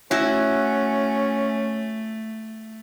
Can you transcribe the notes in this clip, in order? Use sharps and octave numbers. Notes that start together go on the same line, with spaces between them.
A3 C#4 E4 F#4